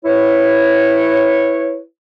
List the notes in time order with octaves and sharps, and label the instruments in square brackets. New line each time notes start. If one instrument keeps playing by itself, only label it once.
[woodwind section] E4 B4 C#5